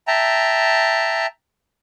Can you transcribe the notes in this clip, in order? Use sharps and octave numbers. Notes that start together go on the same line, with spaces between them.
E5 G5 A5 A#5